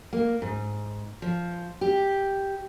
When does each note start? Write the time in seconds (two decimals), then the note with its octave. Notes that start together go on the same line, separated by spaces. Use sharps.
0.13 A#3
0.42 G#2
1.22 F3
1.81 G4